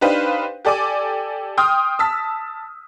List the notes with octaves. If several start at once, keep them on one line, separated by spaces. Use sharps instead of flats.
D4 D#4 G4 B4 C5 F5
G4 A4 D5 G#5 D6
G5 C6 D#6 F6
A5 E6 B6